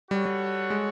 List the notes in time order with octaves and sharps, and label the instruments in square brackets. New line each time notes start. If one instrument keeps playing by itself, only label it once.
[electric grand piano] G3 [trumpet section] F#4 A4 C#5 F#5
[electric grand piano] G3
G#3